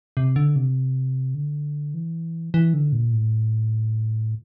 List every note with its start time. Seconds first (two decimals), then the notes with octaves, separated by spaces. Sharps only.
0.17 C3
0.36 D3
0.56 C3
1.35 D3
1.94 E3
2.54 E3
2.74 D3
2.92 A#2
3.13 A2